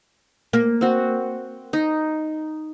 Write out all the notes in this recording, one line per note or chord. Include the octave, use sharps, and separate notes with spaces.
A#3
C4 F#4
D#4